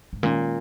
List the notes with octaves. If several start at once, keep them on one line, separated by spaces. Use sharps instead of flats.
G#2
A#2 D#3 G#3 C#4